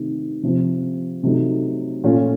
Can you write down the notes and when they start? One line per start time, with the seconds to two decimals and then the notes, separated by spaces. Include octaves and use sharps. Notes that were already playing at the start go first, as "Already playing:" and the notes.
Already playing: C3 D#3 A3
0.43 C3 F3 C4
1.23 C3 F#3 A3 D#4
2.04 A#2 A3 C#4 F4